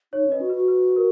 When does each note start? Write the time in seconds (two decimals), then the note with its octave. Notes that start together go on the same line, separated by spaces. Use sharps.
0.13 D#4 C#5
0.27 C#4 B4 D#5
0.41 F#4
0.50 B4
0.55 F#4
0.68 B4
0.96 A#4